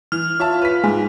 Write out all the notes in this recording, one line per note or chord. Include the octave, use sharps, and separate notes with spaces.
E3 F6
F4 C#5 E5 A5
B4 B6
G#2 G#3